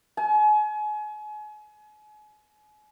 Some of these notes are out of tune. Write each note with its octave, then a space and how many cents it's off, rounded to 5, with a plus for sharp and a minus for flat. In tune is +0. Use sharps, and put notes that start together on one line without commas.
G#5 +35